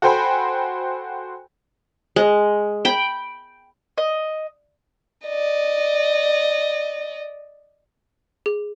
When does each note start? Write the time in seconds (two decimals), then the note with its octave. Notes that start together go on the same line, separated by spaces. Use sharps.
0.02 F#4 A4 C5 G5 G#5 B5
2.16 G#3
2.85 G5 B5
3.98 D#5
5.27 D5 D#5
8.46 G#4